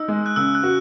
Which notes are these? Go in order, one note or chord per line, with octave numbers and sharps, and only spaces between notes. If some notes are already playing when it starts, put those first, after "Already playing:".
Already playing: D#4 E6
G#3
F#6
C#3 E6
F#6
F#4